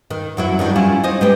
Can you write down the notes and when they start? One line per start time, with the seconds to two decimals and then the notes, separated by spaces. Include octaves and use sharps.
0.11 D#3
0.37 F#2 F#3 E4
0.59 D#3 G3 D4
0.75 C#4 E4 F4
1.04 D#4 C5 D#5
1.21 G#3 B3 G4